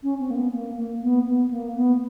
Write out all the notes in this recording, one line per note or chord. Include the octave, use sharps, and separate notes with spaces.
C#4
C4
A#3
B3
A#3
A#3
B3
B3
A#3
B3